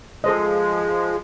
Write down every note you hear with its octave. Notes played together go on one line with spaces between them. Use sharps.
F3 G#3 A4 C5 D#5